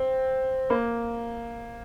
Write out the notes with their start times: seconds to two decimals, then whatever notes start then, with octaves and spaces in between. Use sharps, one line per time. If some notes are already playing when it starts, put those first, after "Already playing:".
Already playing: C4
0.70 A#3